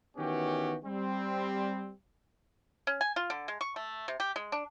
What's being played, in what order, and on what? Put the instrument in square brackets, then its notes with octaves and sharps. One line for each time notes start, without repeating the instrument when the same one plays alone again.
[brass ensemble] D#3 E3 B3 C#4 F#4 G4
G3 C4
[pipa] C#4
G#5
F4
D3
G#3
C#6
A3
C3
G4
G#3
D4